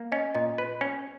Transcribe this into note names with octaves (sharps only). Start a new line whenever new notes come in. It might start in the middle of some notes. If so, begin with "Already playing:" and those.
Already playing: A#3
C#4 D#5
A#2 D#5
B4
C#4